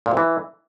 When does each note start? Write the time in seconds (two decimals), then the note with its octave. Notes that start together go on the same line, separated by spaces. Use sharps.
0.06 A#2
0.11 C3
0.17 E3